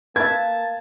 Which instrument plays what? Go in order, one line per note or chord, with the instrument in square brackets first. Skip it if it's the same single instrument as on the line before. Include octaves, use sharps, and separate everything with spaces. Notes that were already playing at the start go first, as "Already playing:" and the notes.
[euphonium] A#3 [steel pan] B4 E5 [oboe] A5 [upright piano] G#6